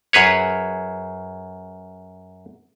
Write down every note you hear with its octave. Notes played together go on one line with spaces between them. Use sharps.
F#2 G#4 B4 C#5